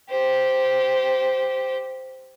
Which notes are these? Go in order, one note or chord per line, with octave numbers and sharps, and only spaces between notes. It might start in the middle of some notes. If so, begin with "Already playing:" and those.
G4 C5